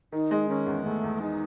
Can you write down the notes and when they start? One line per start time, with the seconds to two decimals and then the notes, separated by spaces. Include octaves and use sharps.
0.12 D#3 D#4
0.31 G#3
0.49 D#3 C#4
0.67 E2
0.85 E2 A3
1.04 E2
1.21 G#3 D#4